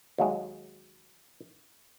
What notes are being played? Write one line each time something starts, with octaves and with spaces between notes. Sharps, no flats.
D#2 F#3 G#3